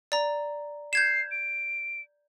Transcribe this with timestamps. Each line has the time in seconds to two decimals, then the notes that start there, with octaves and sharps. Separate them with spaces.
0.12 D5 A#5
0.93 G6 G#6 C7 E7
1.31 D7